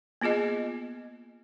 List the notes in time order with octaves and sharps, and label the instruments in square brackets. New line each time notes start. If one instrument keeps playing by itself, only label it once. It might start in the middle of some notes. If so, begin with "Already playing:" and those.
[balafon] A#3 B3 F4 G#4 D#5